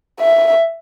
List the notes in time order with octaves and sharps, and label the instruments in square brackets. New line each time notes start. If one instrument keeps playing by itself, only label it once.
[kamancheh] E5